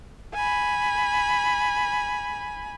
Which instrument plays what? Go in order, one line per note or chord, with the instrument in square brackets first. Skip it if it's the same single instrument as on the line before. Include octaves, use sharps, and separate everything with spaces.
[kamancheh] G#5 B5